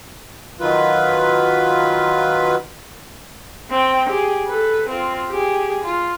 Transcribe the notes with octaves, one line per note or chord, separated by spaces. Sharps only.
D#3 F#3 F4 B4
C4 G5
G4 G#4
A4 B4
C4 F4
G4 G#4
F4